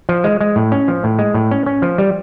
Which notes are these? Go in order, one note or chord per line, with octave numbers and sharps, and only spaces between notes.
F3
G#3
G#3
A2
C#4
F3
A2
G#3
A2
C#4
C#4
F3
G3